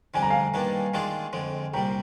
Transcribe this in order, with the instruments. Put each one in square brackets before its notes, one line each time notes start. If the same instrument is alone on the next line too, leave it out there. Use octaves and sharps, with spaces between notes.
[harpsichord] F2 D3 G3 D4 [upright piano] G#5
[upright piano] A#5
F5 G#5
[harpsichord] G2 D#3 A#3 D4
D#3 G#3 D4 F4 G#4
F2 D3 G#3
[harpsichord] C2 A#2 G3 [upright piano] G5 A#5